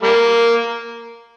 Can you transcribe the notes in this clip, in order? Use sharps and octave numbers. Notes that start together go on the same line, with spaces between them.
G3 A#3